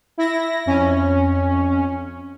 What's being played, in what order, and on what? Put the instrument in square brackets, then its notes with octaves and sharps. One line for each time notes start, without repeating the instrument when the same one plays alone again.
[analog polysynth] E4 A#6
F2 C#4